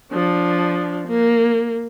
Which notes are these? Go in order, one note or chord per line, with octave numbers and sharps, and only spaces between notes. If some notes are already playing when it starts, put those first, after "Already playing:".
F3 D4
A#3